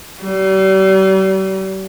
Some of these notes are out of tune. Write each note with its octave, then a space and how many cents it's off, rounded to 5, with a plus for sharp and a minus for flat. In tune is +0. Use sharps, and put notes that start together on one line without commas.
G3 -40